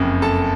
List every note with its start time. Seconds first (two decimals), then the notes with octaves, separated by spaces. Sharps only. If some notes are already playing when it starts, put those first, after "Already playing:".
Already playing: F#1 F2 C#3
0.22 A4 A5